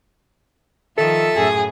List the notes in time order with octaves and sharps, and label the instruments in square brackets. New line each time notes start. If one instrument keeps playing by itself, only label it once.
[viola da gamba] D#3 F3 F4 [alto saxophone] A4 [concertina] E5 A5 E6
[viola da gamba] F#2 A2 A3 [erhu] G#4